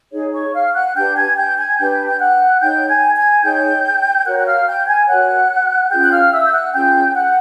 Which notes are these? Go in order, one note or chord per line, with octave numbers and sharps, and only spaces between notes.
D#4 G#4 C#5
C#5 C#6
F5 F6
F#5 F#6
D4 G4 B4 G5 G6
G#5 G#6
G5 G6
G#5 G#6
D4 G4 B4 G5 G6
G6
F#5 F#6
D#4 G#4 C#5 G5 G6
G#5 G#6
G#5 G#6
D#4 G#4 C#5 G5 G6
F#4 A#4 C#5 F#5 F#6
F#6
F5 F6
G5 G6
G#5 G#6
F#4 A#4 C#5 F#5 F#6
C#4 F4 G#4 G5 G6
F#6
F5 F6
E5 E6
G6
F#5 F#6
C#4 F4 G#4 G5 G6
F#5 F#6